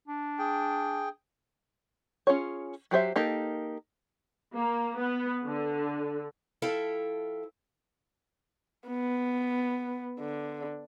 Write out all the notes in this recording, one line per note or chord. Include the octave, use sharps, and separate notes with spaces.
D4
G#4 G5
C#4 F4 G#4 C#5
F#3 G4 C5 E5
A#3 D#4 G4 A4
A#3
B3
D3
F3 E4 A4 F5 G5
B3
D3